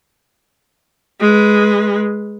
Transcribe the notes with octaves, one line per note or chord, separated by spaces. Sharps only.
G#3 B4